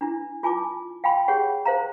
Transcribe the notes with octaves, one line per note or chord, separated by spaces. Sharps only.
D4 E4
F4 G#5 A5 D6
F5 G5 G#5 B5 C6
G4 G#4 C#5 F#5 G5
C5 F5 A#5